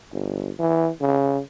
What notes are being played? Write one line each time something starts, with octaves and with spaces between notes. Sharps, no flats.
G1
E3
C#3